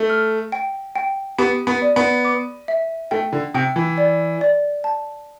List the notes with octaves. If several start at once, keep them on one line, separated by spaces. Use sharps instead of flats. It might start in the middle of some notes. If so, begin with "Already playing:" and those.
Already playing: A3
F6
G5
G5
B3 G4
B3
D5
B3
D6
E5
A3 G5
D3
C3 G5
E3
D5
D5
A5